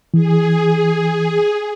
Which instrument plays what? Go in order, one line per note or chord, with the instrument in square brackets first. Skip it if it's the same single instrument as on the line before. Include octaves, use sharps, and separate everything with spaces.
[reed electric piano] E3 [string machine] G#4